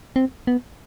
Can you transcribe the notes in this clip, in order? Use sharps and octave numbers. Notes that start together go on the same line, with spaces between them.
C4
B3